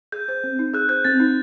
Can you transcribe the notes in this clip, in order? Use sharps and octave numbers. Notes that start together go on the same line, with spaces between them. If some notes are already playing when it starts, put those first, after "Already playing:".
G#4 G6
C5
C4
D#4
G#4 F#6
C5 G6
C4 A6
D#4